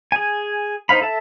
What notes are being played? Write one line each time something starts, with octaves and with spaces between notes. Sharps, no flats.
G#4 G#5
D#4 C5 F5 B5
A4 E5 A5